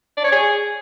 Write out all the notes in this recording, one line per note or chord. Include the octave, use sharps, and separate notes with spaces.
D5
C#5
G#4